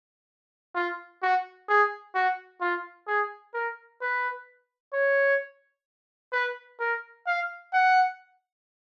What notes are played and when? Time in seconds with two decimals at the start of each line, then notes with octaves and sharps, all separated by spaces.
0.75 F4
1.22 F#4
1.69 G#4
2.15 F#4
2.61 F4
3.07 G#4
3.54 A#4
4.01 B4
4.93 C#5
6.33 B4
6.80 A#4
7.27 F5
7.73 F#5